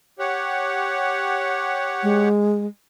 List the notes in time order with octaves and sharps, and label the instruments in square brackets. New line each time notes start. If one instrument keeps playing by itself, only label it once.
[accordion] G4 C#5 F#5
[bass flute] G#3